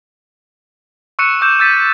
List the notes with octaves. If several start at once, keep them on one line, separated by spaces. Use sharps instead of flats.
C#6 E6 F#6 C#7 D#7 E7
D6 E6 G6 C#7 E7
E6 G6 A6 B6 D#7